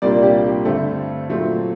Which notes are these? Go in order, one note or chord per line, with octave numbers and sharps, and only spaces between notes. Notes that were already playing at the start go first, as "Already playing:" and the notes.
C2 A#2 G3 A#3 D4 D5
G4
G4
G2 D3 A3 C4 A4
A#2 F#3 A3 C4